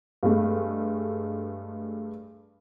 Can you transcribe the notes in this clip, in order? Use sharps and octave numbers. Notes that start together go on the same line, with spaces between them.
G2 G#3 A3